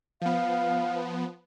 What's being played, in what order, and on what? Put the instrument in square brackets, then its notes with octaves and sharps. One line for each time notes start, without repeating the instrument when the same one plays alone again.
[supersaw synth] F3 B3 [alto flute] F5